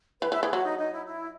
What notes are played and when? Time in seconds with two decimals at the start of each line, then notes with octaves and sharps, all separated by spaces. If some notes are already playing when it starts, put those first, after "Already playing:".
0.21 E3 B4
0.32 E3 E5
0.43 E3 G#4
0.53 F#3 F#4
0.64 D#4
0.78 D#4
0.92 E4
1.06 E4